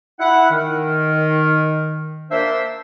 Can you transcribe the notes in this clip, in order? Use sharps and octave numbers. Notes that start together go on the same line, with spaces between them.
E4 F#5
D#3
A#3 D4 C5 E5